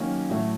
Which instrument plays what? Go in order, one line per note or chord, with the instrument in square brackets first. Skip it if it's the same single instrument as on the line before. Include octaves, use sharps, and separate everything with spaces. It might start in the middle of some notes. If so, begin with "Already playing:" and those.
Already playing: [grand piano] D#3 F#3 A#3 C#4
A2 F#3 A3